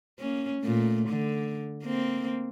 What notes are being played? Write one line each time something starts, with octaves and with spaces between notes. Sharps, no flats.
A#3 C#4
A#2 A3
D3
A#3 C4